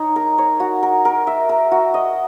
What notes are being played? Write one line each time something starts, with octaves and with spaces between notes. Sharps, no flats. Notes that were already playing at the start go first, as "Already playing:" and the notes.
Already playing: D#4 C#5
A#4
C#5
F#4
A#4
A#4
E5
A#4
F#4
D#5